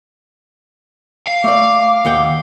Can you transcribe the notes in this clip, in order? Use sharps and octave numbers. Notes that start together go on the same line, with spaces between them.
F5
A3 D5 D6
D#2 F#5 G5